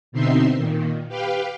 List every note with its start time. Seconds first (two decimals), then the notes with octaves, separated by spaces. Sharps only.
0.12 B2 D3 C4 D#4 E5 C6
0.58 A#2 D#3
1.08 G4 B4 F5 G5